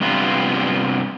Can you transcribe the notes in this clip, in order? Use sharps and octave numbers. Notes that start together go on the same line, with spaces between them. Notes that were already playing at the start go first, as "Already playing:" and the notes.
G2 C3 B3 F4